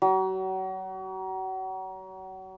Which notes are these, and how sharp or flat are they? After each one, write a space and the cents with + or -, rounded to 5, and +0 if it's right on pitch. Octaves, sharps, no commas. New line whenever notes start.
F#3 +35